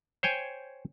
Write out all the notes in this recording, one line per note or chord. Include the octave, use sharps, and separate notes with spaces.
C5 C#5 G5 G#5